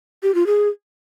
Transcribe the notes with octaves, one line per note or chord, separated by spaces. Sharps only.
G4
F4
G#4